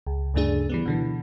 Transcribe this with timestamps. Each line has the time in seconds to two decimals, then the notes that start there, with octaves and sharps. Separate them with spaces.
0.07 C#2
0.34 D2 G2 C#3 A3 D4 G#4
0.69 E3 G3 B3
0.86 B2 D3 E3